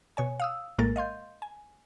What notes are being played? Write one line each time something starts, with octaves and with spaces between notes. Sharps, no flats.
B2 C#5 G#5
F5 D#6 E6
A#1 A2 G#3 A#3 A#4 A6
D#5 F5 C6 G6
G#5